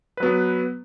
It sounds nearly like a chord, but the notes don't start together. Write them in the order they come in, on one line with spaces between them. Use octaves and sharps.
B4 F#3 B3